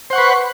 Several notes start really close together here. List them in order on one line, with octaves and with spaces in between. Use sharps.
C5 F#5 C#6 B4